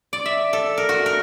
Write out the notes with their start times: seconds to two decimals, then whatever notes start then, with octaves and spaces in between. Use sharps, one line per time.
0.13 D5
0.26 E5
0.53 A4
0.77 A#4
0.89 F#4
1.06 A#4